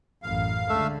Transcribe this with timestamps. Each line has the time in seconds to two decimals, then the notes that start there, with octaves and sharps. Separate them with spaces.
0.23 A1 F#2 F5
0.69 C#2 D3 A3 E5